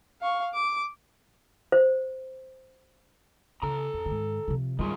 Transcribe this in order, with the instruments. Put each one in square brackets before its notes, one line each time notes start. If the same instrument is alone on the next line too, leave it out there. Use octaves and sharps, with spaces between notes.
[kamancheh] F5 C#6
D6
[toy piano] C5
[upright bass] C#3 [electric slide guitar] A4 A#5
[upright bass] F2
G#2 D#3
C3 F3
[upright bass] G#2 G3 [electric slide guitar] D#3 F4 G#4